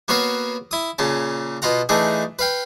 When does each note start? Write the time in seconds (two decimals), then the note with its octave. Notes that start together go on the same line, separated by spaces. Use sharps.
0.08 A#3 B3 F#4 C#5 F5
0.71 E4 D#6
0.98 A#2 C#3 C#4 A5
1.62 B2 F4 F#5 A#5
1.89 E3 A3 D4 D#4 G#4
2.39 B4 F5 G5